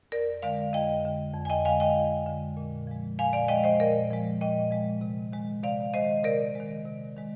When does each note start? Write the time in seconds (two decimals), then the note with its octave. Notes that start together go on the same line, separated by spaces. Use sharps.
0.12 F2 A#4 D5
0.42 D3 G#3 D5 F5
0.73 F2 D#5 G5
1.05 D3 G#3
1.34 F2
1.45 G#5
1.50 D#5 G5
1.65 D3 G#3 F5 G#5
1.80 D#5 G5
1.96 F2
2.27 D3 G#3
2.57 A#2
2.87 F3 G#3
3.18 A#2 F5 G#5
3.33 D5 F5
3.48 F3 G#3 D#5 G5
3.64 C5 D#5
3.80 A#2 A#4 D5
4.11 F3 G#3
4.41 A#2 D#5 G5
4.71 F3 G#3
5.01 C3
5.32 D#3 G#3
5.63 C3 D5 F5
5.93 D#3 G#3 C5 D#5
6.24 C3 A#4 D5
6.55 D#3 G#3
6.85 C3
7.16 D#3 G#3